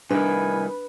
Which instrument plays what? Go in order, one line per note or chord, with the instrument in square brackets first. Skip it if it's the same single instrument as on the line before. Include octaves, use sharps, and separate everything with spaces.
[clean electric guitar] C2 D#3 [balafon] D4 [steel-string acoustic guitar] B4 [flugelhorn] G#5